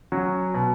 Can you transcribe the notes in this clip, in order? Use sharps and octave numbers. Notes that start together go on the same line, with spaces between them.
F#3 C#4 F#4
B2